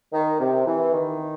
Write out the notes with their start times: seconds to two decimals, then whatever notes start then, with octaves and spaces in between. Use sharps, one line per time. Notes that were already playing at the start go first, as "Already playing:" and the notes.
0.12 D#3
0.39 C3
0.65 E3
0.93 D#3